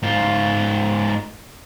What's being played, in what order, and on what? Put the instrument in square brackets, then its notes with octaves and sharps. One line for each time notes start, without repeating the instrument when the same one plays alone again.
[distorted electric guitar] G#2 F4